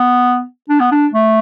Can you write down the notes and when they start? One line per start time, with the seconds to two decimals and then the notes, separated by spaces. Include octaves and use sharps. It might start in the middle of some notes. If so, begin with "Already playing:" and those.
Already playing: B3
0.69 D4
0.80 B3
0.92 D4
1.14 A3